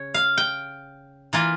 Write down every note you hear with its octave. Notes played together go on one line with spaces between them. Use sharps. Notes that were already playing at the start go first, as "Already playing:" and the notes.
Already playing: C#3 C#5
F5
G5
E3 A#3 F4